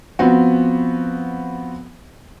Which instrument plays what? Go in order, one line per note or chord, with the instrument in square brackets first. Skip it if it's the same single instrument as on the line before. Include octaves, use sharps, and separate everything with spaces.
[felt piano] F3 B3 C4 F#4